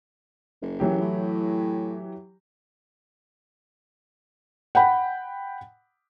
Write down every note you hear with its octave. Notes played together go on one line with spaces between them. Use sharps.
F#1
E3 F#3 G4
A2
F#5 G5 B5